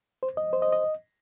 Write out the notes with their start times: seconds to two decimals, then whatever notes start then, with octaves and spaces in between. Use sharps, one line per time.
0.23 C5
0.37 D#5
0.53 C5
0.62 D#5
0.72 D#5